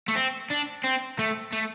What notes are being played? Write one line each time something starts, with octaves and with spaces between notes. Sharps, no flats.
A3
C4
D4
C4
A3
A3